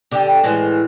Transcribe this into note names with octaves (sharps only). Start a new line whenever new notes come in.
D3 G4
A2 E3 G#3